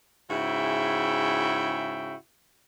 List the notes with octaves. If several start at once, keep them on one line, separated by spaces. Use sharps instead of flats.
G#2 C#3 E4 F#4 E5 G5